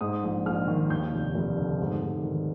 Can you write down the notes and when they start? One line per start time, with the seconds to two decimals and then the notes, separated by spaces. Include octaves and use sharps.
0.01 G#2 D#6
0.23 A#1
0.46 A#1 F6
0.68 D#3
0.90 D#2 G6
1.12 F1
1.35 F1
1.58 D3
1.80 G#2
2.01 G#2
2.23 D#3